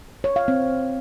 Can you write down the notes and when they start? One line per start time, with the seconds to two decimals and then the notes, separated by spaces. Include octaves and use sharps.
0.24 C#5
0.36 F5
0.48 C4